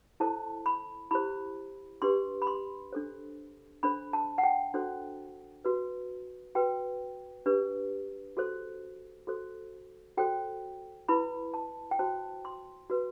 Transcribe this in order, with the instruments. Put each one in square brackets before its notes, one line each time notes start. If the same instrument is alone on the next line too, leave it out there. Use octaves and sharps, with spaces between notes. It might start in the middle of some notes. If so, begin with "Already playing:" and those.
[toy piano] E4 A4 C5 A5
B5
E4 G4 C5 B5
D4 G4 B4 C6
B5
C6
D4 A4 C5
D4 A4 C5 B5
A5
F#5
G5
D4 F#4 A4 C5
F#4 B4
F#4 B4 G5
D4 G4 B4
F#4 A4 C5
F#4 A4 C5
F#4 A4 C5 G5
E4 B4 B5
A5
G5
F#4 C5 A5
C6
F#4 B4